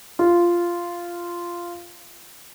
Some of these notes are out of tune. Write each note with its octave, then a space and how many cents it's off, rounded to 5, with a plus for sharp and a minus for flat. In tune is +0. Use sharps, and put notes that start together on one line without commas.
F4 -10